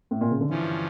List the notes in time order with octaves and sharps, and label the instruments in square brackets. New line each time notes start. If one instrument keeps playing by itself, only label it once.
[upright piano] A2
A#2
C#3
D3
[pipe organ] G2 F3 C#4 [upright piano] E3